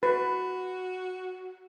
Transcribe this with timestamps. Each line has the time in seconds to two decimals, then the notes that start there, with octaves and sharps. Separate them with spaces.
0.03 F#4 B4